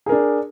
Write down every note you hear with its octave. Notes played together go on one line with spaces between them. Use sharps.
D4 G#4 A#4